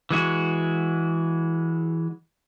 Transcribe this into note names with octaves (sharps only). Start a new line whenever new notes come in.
E3 G#3 F#4